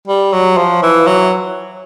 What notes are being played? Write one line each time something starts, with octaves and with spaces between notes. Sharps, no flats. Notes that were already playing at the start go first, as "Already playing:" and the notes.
G3
F#3
F3
E3
F#3